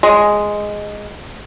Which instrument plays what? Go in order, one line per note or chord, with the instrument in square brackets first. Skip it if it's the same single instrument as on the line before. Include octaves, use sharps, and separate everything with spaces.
[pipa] G#3